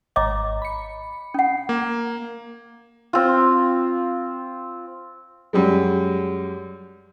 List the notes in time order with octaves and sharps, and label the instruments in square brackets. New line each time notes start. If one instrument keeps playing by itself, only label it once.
[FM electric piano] G#1 A#5 [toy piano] C#5 D#5 D6
[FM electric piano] B5 C#7
[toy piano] C#4 F#5
[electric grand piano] A#3
[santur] C4 F4
[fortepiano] F#2 G3 G#3